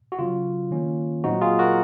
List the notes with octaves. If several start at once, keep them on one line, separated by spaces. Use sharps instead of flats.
F#4
C#3 F#3 C#4 F4
D#3 A#3 C#4
A#2 F#3 C4 D#4 F#4
F4 G#4
F#4 A#4